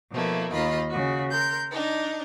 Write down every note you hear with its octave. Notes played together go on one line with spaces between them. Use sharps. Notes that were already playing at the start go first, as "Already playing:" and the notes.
B2 F3 A3 A#3 E4
D#2 D#3 F4 D#5 B5
C#3 F#4
A#4 C6 G6
D4 D#4